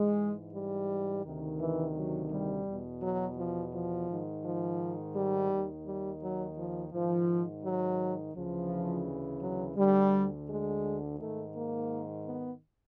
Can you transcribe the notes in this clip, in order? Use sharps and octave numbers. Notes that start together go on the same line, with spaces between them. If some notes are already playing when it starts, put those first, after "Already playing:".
Already playing: G#2 E3 G#3
G3
D2 C3 D#3
E3
F#3
G3
E2 B2
F#3
F3
F3
G#2 D#3
F3
G3
D#2 D#3
G3
F#3
F3
G#2 D#3 F3
F#3
D2 C#3 E3 F3
F#3
D2 D3 G3
G#3
G#2 D#3 A3
A#3
B3